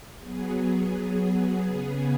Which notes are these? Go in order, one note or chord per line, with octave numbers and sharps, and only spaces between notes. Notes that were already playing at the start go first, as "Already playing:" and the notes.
F#3 B3 G#4
C#3 B3 G#4